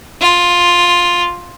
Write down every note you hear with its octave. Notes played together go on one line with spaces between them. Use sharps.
F4